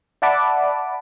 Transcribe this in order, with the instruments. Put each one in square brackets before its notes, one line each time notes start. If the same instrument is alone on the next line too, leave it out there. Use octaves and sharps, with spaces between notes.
[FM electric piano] D5 E5 F#5 A5 B5 D6